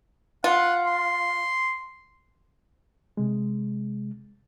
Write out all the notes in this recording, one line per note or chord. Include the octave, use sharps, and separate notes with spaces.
F4 F#5
C6
C3 G#3